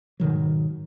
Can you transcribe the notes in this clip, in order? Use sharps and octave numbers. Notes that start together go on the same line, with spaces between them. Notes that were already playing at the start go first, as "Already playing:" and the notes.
G#2 B2 D#3 F#3